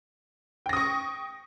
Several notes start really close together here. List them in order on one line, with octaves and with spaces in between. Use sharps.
G5 A#6 D#6 C#6